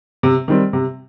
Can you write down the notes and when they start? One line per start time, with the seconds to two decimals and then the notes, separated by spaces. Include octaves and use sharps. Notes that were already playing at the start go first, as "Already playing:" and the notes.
0.23 C3
0.48 D#3 G3 C4
0.73 C3